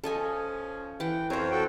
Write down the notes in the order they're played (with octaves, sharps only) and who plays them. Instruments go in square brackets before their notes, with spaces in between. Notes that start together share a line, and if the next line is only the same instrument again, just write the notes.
[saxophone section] F3 C#4 [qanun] A4 D#5 G#5
[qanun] E3 F#5 [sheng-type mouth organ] G5
[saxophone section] F2 C4 [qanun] A#4 C5 [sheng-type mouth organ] C#5
[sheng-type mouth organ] F#4 A4 G5